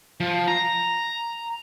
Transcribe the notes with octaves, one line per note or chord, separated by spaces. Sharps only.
F3
A#5